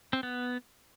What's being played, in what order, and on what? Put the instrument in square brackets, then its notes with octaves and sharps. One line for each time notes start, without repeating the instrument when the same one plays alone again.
[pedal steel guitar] C4
B3